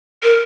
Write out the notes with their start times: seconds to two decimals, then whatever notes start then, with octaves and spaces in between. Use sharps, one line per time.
0.23 A#4